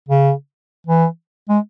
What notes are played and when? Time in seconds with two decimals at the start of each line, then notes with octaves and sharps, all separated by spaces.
0.08 C#3
0.87 E3
1.49 G#3